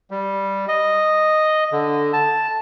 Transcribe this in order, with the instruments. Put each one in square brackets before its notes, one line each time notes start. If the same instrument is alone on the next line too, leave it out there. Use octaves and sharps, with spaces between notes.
[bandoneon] G3
D#5
D3
A5